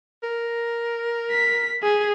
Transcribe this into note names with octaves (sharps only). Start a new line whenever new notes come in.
A#4
B6
G#4